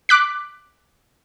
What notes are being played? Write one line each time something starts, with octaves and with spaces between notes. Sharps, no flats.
D6 F#6 B6